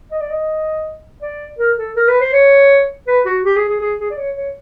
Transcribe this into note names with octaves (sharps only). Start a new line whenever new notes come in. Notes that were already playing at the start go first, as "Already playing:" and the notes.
D#5
D5
D#5
D5
A#4
A4
A#4
B4
C5
C#5
B4
F#4
G4
G#4
G#4
G#4
G#4
D5
C#5
C#5